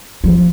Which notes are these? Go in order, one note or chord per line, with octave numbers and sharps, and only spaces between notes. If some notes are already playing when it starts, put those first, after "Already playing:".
F3